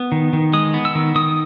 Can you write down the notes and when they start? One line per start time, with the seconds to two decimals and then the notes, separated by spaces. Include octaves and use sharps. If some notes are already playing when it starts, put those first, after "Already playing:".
Already playing: B3
0.12 D#3
0.33 D#3
0.53 G#3 D#6
0.74 B3
0.85 E6
0.95 D#3
1.15 D#3 D#6